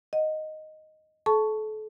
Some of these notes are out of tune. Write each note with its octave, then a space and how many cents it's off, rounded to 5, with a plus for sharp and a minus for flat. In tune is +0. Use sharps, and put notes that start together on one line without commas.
D#5 +0 F#5 +0
A4 -35 A5 +0 C#6 +5